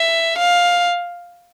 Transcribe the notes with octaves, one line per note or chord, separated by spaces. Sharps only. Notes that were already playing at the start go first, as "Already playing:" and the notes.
Already playing: E5
F5